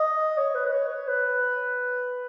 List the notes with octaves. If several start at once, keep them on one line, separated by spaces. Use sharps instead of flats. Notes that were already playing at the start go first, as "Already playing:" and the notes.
Already playing: D#5
C#5
B4
B4
C#5
C#5
B4